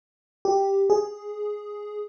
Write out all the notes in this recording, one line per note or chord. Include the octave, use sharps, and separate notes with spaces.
G4
G#4